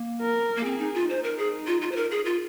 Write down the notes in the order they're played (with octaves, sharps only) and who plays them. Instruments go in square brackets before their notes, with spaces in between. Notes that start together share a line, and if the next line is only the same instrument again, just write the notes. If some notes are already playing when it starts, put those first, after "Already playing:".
Already playing: [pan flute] A#3
[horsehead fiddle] A#4
[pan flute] A#3
[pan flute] C4 [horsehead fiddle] G#4
[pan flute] D#4
F4
[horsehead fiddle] D#4 [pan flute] C5
[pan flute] A#4
G#4
F4
F4
C5
A#4
G#4
F4